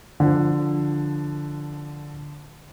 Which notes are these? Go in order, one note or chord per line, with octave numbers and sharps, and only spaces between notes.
D3 F3